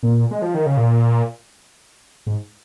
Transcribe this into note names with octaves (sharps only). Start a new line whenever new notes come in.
A#2
G#3
F3
D#3
C#3
A#2
G#2